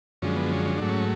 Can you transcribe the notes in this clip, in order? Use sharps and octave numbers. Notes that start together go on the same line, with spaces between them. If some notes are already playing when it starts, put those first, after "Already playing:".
F#2 D3 F3 G#3 C#4
B3
C#4
C#4
G#2 F#3 A3 D4
C#4